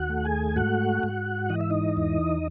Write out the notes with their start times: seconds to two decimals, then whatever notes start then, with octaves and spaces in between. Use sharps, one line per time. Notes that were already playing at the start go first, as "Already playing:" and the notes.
Already playing: D#2 F#4 F#5
0.10 A3
0.24 G#4 G#5
0.56 G#2 F#4 F#5
1.03 G#2
1.49 E3 D#5
1.61 E5
1.70 D#4 D#5
1.97 E2